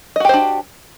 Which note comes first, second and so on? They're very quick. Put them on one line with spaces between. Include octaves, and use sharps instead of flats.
D#5 F#4 G4 C5 D4